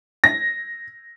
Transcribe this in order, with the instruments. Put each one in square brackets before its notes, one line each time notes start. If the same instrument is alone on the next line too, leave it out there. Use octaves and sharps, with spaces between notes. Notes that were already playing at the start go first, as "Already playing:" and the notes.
[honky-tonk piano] A#6